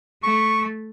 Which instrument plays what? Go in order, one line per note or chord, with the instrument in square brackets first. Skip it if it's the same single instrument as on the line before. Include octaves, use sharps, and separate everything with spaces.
[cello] A3 [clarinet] C#6